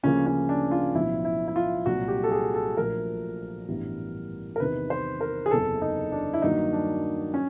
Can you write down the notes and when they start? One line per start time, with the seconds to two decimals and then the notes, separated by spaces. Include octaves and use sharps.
0.03 D2 C#3 F3 A#3 C#4
0.26 C#4
0.49 D4
0.71 F4
0.95 B1 A2 F3 E4
1.25 E4
1.48 E4
1.56 F4
1.86 C2 A#2 F#3 F#4
2.08 G4
2.24 A4
2.31 G#4
2.55 A4
2.77 A#1 A#2 F3 A3 A#4
3.68 A1 G2 E3 G3 B3
4.56 A#4
4.60 E2 C3 D#3 B4
4.90 C5
5.21 A#4
5.46 G#4
5.51 F#1 E2 C3 E3 A4
5.82 D#4
6.12 D4
6.33 E4
6.42 G2 D#3 F#3 A#3 D#4
6.73 D4
7.34 C#4